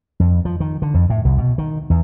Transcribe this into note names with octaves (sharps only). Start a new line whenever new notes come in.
F2
F3
D#3
D3
F2
A2
C2
B2
D#3
E2